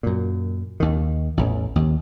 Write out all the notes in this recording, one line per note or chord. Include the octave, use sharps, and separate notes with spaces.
F#2 A#2
D#2 D#3
A1 E2
D#2